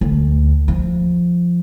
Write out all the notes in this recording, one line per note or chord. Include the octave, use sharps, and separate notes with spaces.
D2
F3